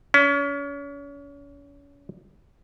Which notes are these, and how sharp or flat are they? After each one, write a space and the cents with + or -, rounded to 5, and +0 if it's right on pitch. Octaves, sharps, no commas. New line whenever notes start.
C#4 +35